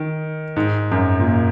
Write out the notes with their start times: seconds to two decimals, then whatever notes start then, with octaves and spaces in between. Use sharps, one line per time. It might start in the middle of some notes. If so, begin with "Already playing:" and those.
Already playing: D#3
0.56 G#2
0.91 F#2
1.19 A#2